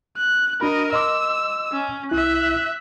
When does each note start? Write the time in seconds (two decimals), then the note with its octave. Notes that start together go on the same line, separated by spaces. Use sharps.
0.17 F#6
0.61 D4 F#4 A#4 D#5 B5
0.93 D#5 C6 D6 E6
1.73 C#4
2.11 C2 E4 E5 F#6